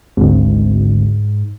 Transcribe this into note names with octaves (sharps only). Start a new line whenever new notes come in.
G#1 D2 G#2